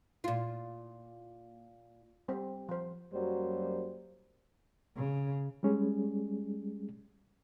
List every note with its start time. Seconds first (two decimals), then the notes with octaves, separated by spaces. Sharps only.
0.24 A#2 F4
2.28 G3 C4 C5
2.69 F3 C5
3.13 F#2 F#3 G3 A#3 C5
4.96 C#3
5.63 G3 G#3 C#4 G#4